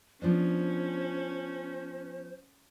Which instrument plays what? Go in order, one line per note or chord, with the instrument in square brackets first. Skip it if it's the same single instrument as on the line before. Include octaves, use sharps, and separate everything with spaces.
[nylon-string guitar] F3 B3 D4 [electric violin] C#4 [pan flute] C5